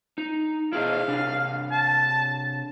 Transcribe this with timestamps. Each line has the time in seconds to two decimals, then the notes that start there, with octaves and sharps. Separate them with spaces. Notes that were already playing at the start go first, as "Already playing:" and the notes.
0.18 D#4
0.73 E4 G#4 D#5 F5
1.08 C3 D4
1.72 A5